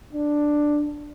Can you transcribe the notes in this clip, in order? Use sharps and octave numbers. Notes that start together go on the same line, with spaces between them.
D4